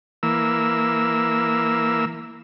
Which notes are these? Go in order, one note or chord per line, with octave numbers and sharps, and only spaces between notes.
E3 A#3 E6